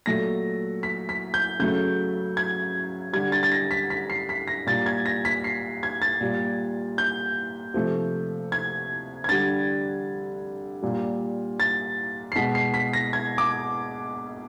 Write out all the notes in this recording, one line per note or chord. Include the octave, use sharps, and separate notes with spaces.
A#2 F#3 A3 A#6
B6
B6
G6
C#3 F#3 A3 G6
G#6
D3 G3 G#6
A6
A6
A#6
B6
B6
C7
B6
A#6
A#2 G3 A6
G#6
A#6
B6
C7
G#6
A6
A#2 G3
G6
C3 F3 A3
G#6
G#6
D3 G3 A6
A#2 G3
A6
C7
B2 G#3 B6
C7
B6
A#6
G#6
D6